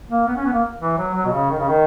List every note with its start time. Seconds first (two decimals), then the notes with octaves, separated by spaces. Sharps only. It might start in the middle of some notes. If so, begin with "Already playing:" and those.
0.09 A#3
0.27 B3
0.36 C#4
0.45 B3
0.53 A#3
0.80 E3
0.98 F#3
1.15 F#3
1.25 B2
1.32 C#3
1.50 D#3
1.59 C#3
1.68 D#3